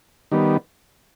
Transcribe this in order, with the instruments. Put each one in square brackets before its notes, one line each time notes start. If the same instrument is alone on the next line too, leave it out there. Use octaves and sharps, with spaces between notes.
[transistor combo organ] D#3 G3 B3